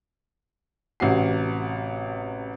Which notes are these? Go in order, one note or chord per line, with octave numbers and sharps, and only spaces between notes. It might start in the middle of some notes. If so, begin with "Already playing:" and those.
A1 C3 F#4 C7